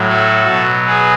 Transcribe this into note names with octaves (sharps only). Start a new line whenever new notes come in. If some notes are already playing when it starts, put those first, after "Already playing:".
Already playing: A2 F#3
F#4 A4
B2 F#3
G#4 B4